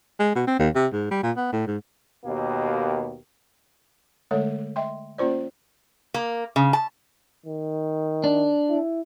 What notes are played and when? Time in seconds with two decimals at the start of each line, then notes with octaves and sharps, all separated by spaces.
0.20 G#3
0.35 B2
0.47 C4
0.59 D#2
0.75 C3
0.93 G#2
1.11 G3
1.23 A#2
1.37 B3
1.52 A2
1.67 G#2
2.25 D#2 B2 A#3 G4
4.31 D3 G#3 A3 A4 C#5
4.76 D#5 E5 G5 C6
5.18 A#3 C#4 F4 C5 D5
6.14 A#3
6.56 C#3
6.73 A5
7.46 D#3
8.24 D4
8.69 E4